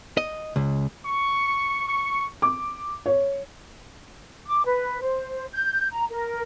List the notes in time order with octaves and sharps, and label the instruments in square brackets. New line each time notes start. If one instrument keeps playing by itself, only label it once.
[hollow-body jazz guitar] D#5
C#2
[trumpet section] C#6
C#6
[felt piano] D6
C#5
[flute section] D6
B4
C5
G6
A#5
A#4